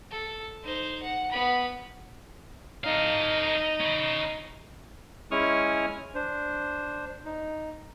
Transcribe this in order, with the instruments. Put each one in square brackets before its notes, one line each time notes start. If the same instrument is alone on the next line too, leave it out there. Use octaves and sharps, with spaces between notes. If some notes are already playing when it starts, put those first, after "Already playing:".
[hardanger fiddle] A4
D#4 C5
F#5
B3 B5
[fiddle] D#4 [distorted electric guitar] A4 F5
[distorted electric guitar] C#4 B5
[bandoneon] G#3 C#4 E4 C#6 D#6 F6
D4 C5
D#4